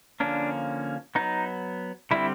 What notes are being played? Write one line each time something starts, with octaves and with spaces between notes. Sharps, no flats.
D3 F3 A#3 C#4 D4
F#3 B3 D#4
D3 G3 C4 E4